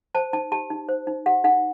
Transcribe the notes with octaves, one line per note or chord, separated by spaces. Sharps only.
C5 A5
D#4 A5
G4 A5
D#4
C5
D#4
G4 F#5
D#4 F#5